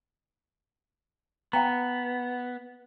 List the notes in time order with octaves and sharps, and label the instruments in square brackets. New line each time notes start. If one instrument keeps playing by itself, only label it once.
[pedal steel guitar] B3 [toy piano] F5 G5 A#5